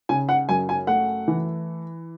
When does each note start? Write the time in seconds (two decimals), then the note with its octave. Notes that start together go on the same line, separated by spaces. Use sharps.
0.09 C#3 G#5
0.29 F#5
0.49 F#2 G#5
0.69 G#5
0.87 A3 F#5
1.28 E3